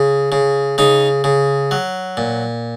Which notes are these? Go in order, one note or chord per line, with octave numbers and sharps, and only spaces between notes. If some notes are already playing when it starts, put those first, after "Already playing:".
Already playing: C#3
C#3
C#3 D#4
C#3
F#3
A#2